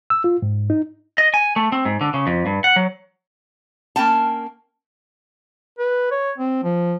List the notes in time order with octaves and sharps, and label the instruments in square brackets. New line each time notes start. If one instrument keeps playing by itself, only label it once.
[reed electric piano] E6
F4
G#2
D#4
[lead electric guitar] D#5
G#5
A3
C4
G#2
D3
C#3
F2
G2
F#5
F#3
[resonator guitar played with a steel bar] A#3 C#4 G5 A5
[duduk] B4
C#5
C4
F3